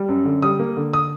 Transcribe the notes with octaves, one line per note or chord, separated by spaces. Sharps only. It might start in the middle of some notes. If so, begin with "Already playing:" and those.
Already playing: G3
F#2
D3
G3 D#6
A#3
D3
D#6